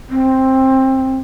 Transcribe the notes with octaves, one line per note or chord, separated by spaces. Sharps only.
C4